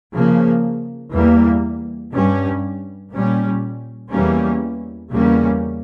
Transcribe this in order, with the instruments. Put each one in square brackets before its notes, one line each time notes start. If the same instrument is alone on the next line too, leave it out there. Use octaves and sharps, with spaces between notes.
[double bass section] C#3 F3 A#3
E2 E3 G3 A#3
G2 G3 C#4
A#2 G3 C#4
E2 E3 G3 A#3 C#4
E2 C#3 G3 A#3 C#4